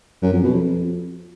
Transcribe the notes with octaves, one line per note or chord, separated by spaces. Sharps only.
F#2
F2
B2
F2